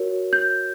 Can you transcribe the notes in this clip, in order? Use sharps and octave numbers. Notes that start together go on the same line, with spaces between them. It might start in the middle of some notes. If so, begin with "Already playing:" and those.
Already playing: F#4 A#4 C#5
G6